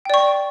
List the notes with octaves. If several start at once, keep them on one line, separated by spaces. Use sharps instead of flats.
D5 G5 C#6